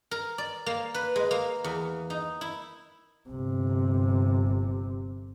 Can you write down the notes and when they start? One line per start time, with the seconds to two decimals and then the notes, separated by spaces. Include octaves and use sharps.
0.11 A#4
0.38 D5
0.66 A#3
0.94 B4
1.16 G#3
1.31 A#3
1.64 E2
2.10 D#4
2.41 E4
3.29 G1 C3